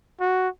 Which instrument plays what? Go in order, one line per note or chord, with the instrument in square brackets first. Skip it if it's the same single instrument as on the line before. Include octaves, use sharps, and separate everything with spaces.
[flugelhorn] F#4